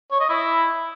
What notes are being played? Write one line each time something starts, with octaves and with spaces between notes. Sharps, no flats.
C#5
D#5
E4